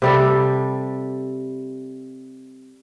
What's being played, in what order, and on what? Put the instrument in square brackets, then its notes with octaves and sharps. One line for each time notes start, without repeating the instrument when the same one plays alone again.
[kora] C3 G3 A4